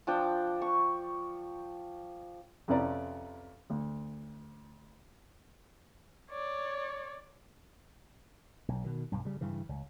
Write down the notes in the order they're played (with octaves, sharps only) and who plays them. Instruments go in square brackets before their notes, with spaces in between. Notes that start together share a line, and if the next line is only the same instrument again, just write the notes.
[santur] F3 D4 G5
C#6
[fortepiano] F2 C3 C#4 B4 D5 A#5
D2
[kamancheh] C#5 D5
[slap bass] B1
B2 D#3
B1 G2
C#3 G3
G2 C#3 E3
C#2